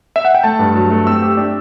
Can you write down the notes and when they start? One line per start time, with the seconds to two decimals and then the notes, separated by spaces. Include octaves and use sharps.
0.16 E5
0.25 F#5
0.35 G5
0.44 A3 A5
0.59 G2
0.75 F#3
0.91 A3
1.06 C4 E6
1.22 G4
1.37 D4